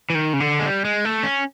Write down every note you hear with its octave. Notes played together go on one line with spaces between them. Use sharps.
E3
D#3
C#3
D3
G#3
G3
G#3
A3
C#4